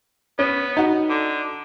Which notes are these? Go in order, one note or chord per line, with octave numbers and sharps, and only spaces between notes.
B3 C#4
D#4 F#4
D3